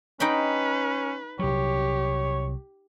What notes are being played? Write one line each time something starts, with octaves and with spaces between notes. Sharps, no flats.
C#4 D#4 B4 G5 B5
C2 F#3 G4 C#5